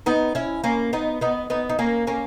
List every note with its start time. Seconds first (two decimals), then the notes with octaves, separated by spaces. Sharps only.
0.06 B3 D#4
0.35 C#4 E4
0.64 A#3 C#4
0.93 B3 D#4
1.21 B3 D#4
1.50 B3 D#4
1.69 D#4
1.79 A#3 C#4
2.07 A#3 C#4